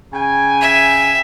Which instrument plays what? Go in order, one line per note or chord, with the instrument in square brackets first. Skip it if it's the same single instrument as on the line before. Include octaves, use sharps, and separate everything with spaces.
[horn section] C#3 G5 G#5
[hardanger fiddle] E5